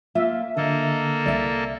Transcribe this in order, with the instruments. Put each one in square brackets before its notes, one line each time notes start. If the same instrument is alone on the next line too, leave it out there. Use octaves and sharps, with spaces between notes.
[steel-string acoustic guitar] A#3 F4 [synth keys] E5
[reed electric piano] D3 [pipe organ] A#3 A4 [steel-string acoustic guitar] D#5
[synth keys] C2 [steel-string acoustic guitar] D5 E5 G5